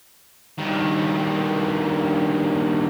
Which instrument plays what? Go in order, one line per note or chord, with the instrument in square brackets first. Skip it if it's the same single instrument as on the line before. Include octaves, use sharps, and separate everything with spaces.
[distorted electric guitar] G2 D#3